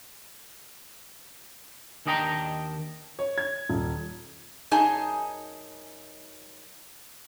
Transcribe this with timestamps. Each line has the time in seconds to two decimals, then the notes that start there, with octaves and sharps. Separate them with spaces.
2.06 D#2 D#3 D4 D#5 G5 A#5
3.19 C#5
3.38 G#6
3.69 D#1
4.71 F#2 D#4 G#4 D#5 G#5 A5